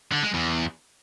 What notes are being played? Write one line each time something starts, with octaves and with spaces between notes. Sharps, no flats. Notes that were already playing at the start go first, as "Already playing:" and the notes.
D3
G#3
E2